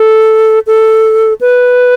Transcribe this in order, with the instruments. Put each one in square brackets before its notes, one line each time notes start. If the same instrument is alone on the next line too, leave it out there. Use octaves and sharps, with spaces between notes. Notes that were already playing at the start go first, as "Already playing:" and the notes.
Already playing: [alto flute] A4
A4
B4